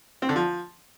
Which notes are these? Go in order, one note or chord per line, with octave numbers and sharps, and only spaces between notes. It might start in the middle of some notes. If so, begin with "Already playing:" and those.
C4
D3
F3